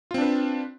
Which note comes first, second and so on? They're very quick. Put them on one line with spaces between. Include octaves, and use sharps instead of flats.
F4 C4 D4 B4